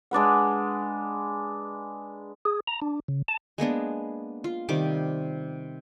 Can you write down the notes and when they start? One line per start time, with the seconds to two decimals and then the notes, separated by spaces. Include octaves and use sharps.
0.11 G#3 D4 B4 F#5
2.45 G#4
2.67 A#5
2.82 D4
3.08 C#3
3.28 A5
3.58 G#3 A#3 B3 D4
4.44 F4
4.69 C3 D#3 G3 D6